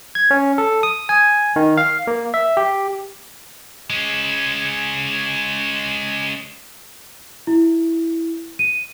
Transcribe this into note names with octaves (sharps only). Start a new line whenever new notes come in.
G#6
C#4
A4
D#6
G#5
D#3
F5
A#3
E5
G4
G#3 C#4
E4
D#7